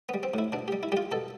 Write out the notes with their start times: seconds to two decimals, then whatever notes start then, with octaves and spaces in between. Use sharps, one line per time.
0.09 B3
0.14 G3
0.23 C4
0.34 A2 E4
0.52 B2 D4
0.68 G4
0.72 G3
0.83 E4
0.92 G3 G4
0.97 F4
1.12 B2 A4